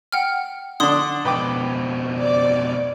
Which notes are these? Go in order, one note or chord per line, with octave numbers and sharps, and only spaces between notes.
F#5 G5 F6
D3 D4 C6 D#6
F2 B2 B4 G5 D6
D5